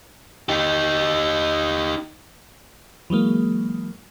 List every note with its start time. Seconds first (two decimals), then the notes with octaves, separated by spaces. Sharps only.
0.49 D#4 G4
3.10 E3 F#3 G#3 A#3